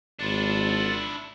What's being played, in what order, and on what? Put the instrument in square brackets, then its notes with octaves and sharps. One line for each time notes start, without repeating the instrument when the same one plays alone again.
[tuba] G#1 [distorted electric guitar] D4 E4 [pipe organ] F4 D5 F#5